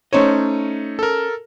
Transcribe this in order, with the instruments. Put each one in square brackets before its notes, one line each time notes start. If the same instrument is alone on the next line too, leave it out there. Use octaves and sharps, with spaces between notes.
[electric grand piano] A3 D#4 C#5 [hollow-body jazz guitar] C#4 C5 D#5
[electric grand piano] A4 A#4